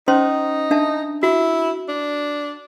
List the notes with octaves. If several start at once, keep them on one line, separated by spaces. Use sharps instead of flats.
C#4 D#4 C5 C6
D4 E5 A5
E4 F#4
D4